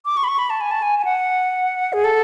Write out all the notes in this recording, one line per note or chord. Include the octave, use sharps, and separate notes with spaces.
D6
C#6
B5
C#6
B5
A5
G#5
A5
G#5
G#5
F#5
G#4
A4